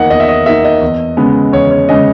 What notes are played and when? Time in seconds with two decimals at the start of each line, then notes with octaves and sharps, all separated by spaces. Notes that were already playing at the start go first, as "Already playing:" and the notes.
Already playing: E2 D#3 A#3 D#5 F#5
0.10 E2 D#5
0.20 E5
0.29 D#5
0.46 D#3 A#3 E5
0.64 D#5
0.81 E2
1.17 C#3 G#3 B3
1.52 E2 C#5
1.71 C#5
1.88 C#3 G#3 B3 D#5